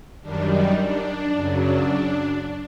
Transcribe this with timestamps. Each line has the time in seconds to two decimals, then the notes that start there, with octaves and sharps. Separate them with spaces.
0.21 F#2 D#3 G3 D4
0.50 D#4
0.78 D4
1.34 F#2 C#3 F#3
1.63 D4